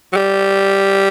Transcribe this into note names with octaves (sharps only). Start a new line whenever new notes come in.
F#3
G3